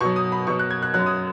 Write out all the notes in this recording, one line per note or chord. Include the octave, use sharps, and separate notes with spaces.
B2 F#3 C#6
D#6
B5
B2 F#3 C#6
F#6
G#6
F#6
F#2 F#3 F#6
D#6